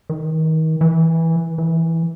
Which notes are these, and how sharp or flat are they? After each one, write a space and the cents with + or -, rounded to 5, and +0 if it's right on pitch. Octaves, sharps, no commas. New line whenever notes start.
D#3 +35
E3 -10
E3 -5